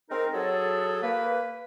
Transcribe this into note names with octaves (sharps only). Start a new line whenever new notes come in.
G#3 C4 D#4 A#4
F#3 G#4 A4
A#3 B4